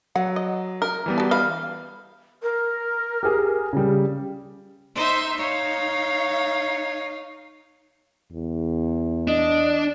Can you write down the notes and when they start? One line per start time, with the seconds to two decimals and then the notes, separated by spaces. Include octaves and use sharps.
0.16 F#3 F#5
0.36 D#5
0.82 A#4
1.06 E3 G3 B3
1.18 F#4 A5
1.31 B4 D#5 F5 B5
2.42 A#4
3.23 G4 G#4
3.73 C#3 G3
4.95 D#4 C5 E5
5.38 D#4 C#5 F5
8.32 E2
9.28 D4 D#5